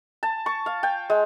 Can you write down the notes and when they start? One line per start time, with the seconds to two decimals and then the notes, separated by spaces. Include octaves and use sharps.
0.23 A5
0.46 C#6
0.66 F5
0.83 G5
1.10 G#3